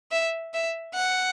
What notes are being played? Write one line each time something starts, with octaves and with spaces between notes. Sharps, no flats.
E5
E5
F#5